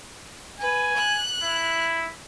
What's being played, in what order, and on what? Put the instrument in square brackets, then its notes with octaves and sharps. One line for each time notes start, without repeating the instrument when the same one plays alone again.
[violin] B4 [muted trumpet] G#5
[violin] F#6
[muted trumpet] E4